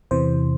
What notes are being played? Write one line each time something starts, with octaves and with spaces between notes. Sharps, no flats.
E2 C3 E3 C5